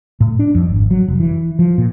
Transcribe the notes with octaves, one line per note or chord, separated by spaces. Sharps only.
A2
D4
F2
G#1
F#3
F1
E3
F3
A#2